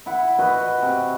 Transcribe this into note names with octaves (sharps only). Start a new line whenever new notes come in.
E4 F#5
F#4 B4 D#5
C3